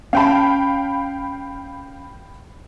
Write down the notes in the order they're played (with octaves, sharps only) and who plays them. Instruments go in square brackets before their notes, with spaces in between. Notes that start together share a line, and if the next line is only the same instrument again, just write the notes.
[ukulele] C#4 A5 [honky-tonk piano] F5 G5 B5